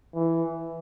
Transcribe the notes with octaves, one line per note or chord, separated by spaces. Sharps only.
E3